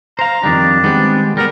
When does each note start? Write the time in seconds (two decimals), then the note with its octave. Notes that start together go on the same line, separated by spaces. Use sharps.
0.19 C5 F5 A#5
0.43 F2 D#3 G3 D4
0.84 D#3 G3 G#3 B3 C4
1.37 G3 B3 A#4